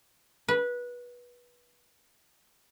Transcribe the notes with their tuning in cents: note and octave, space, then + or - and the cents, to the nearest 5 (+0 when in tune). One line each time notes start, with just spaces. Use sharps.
B4 -20